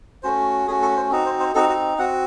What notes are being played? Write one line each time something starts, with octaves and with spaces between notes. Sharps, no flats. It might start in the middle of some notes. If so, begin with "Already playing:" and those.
A3 C#4 F#4 C5
A3 C#4 F#4 G#4
A4
C5
C4 D#4 F#4
C5
C5
C4 D#4 F#4 A4
F#4
C4 F#4 F#5